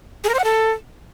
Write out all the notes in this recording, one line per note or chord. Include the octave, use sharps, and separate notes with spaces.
G#4
A#4
C5
F#5
A4